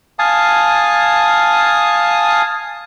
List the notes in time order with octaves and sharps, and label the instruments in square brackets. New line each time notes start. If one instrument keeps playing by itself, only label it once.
[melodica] F5 G#5 A5 D#6